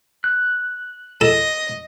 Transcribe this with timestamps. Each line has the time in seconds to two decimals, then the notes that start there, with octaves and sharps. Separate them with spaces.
0.24 F#6
1.21 A4 D#5